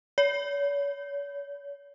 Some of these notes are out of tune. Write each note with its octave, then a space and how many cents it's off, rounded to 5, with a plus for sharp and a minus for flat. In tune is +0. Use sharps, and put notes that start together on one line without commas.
C#5 +40